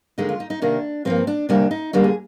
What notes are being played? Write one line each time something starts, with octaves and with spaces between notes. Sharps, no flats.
D#2 D3 G#3 D#4
F4
D#4
D#4
C3 D#3 A#3 D4
G2 F3 A#3 C4
D4
D2 C3 G3 A#3 D4
D#4
D#2 D3 G3 A#3 D4
G#4